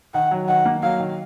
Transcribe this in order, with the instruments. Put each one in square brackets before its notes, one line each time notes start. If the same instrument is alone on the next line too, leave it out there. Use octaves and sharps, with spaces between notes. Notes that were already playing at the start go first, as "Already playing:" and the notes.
[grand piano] D#3 [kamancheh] F#5
[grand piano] F#3
[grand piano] D#3 [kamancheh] F#5
[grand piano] A#3
[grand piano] F#3 [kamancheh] F5
[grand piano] D#3